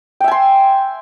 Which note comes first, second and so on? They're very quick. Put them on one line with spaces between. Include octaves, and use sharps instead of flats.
G5 E5 G#5 C6